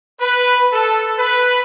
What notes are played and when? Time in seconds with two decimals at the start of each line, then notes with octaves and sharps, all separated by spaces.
0.21 B4
0.72 A4
1.17 B4